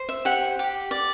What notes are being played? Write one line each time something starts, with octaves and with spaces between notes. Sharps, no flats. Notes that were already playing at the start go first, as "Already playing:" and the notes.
Already playing: C5
E5
G4 F#5
G4
D5